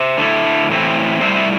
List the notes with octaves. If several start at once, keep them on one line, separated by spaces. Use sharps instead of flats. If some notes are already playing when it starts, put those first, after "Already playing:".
Already playing: C5 E5
D3 A3 E4
A2 E3 A3 C4 E4
A2 G3 E4 C5 E5
E5